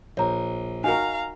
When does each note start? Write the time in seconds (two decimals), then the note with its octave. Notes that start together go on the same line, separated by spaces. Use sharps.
0.17 A#1 C#5 A#5
0.84 D#4 F#4 A#4 F5 G#5 A#5